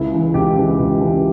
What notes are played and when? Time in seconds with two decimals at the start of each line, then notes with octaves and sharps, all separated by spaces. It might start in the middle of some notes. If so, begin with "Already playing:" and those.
Already playing: C#2 E4
0.12 C#3 E3
0.34 C#2 G4
0.56 C#3 E3
0.79 C#2
1.01 C#3 E3